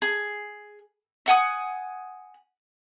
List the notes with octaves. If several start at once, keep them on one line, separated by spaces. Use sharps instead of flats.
G#4
E5 F#5 G#5 D#6